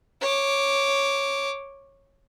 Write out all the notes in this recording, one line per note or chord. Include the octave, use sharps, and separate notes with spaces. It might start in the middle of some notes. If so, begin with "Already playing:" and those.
C#5 D6